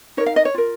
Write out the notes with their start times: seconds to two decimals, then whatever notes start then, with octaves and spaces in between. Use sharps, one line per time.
0.17 D#4 A#4 C#5
0.26 F5
0.36 D#5
0.45 C#5
0.54 F4 A#4